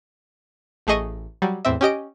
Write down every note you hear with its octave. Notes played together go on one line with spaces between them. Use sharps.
A1 A3 G#4 D#5 C#6 D#7
F#3 G3
E2 A2 C4 E5
C#4 G4 D#5 D7